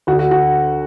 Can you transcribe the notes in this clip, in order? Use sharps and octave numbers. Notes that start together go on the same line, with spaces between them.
D2 F#4
D3
F#4
F#4